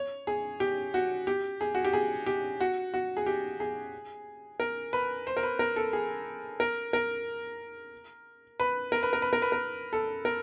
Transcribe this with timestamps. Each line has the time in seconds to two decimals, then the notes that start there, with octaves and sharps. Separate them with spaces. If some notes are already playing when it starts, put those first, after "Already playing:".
Already playing: C#5
0.27 G#4
0.60 G4
0.94 F#4
1.27 G4
1.61 G#4
1.75 F#4
1.84 G4
1.93 G#4
2.26 G4
2.60 F#4
2.94 F#4
3.17 G#4
3.26 G4
3.60 G#4
4.60 A#4
4.93 B4
5.27 C5
5.37 A#4
5.43 B4
5.59 A#4
5.76 A4
5.93 G#4
6.60 A#4
6.93 A#4
8.60 B4
8.92 A#4
9.03 B4
9.13 A#4
9.22 B4
9.33 A#4
9.42 B4
9.52 A#4
9.93 A4
10.25 A#4